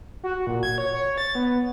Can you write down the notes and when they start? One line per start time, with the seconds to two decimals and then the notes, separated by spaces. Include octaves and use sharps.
0.23 F#4
0.47 A#2
0.63 G#6
0.78 C#5
0.93 C#5
1.18 A6
1.35 B3